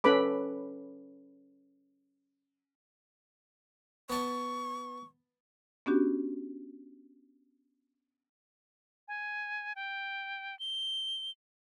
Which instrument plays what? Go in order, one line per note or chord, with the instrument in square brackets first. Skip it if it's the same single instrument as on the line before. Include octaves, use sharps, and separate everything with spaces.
[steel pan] C#4 A4 B4 B5 D6
[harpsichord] B3 A5 [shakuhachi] C#6
[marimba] B3 C#4 D4 F#4 G4
[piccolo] G#5
G5
G7